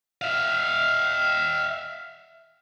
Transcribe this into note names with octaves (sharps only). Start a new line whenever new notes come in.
E5 F5